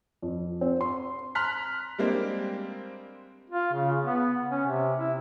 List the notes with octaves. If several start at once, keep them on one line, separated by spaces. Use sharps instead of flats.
F2
C4
C6
A#5 C6 F6 F#6 B6
G3 G#3 A#3 C4 D4 G4
F4
C#3
B3
C#4
C3
E4